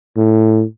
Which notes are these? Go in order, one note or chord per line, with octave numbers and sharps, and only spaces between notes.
A2